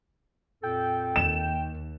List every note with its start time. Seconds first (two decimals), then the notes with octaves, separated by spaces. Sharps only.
0.63 F2 A#2 A4 G5
1.16 D#2 E7